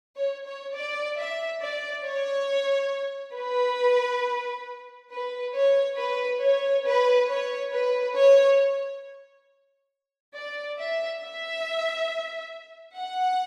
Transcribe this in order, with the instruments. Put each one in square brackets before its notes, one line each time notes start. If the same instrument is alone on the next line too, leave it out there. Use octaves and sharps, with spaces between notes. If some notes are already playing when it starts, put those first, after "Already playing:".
[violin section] C#5
C#5
D5
E5
D5
C#5
B4
B4
C#5
B4
C#5
B4
C#5
B4
C#5
D5
E5
E5
F#5